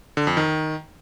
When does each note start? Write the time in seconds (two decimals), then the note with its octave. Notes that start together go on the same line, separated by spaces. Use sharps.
0.17 D3
0.27 F2
0.37 D#3